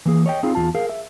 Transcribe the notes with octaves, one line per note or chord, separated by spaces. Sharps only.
E3 A#3 G#4
C#5 D#5 G5
C4 D#4 F4 G#4
E2 C3 F4 A5
G#4 A#4 F5
E5